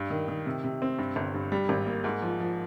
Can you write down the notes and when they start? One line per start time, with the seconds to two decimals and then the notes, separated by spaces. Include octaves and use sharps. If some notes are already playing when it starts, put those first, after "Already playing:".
Already playing: G2
0.10 D#3
0.28 D#3
0.46 C3
0.64 C3
0.82 C4
0.98 G2
1.16 G1
1.34 G2
1.52 G3
1.69 G#1
1.86 A#3
2.04 G#2
2.22 F3
2.40 F3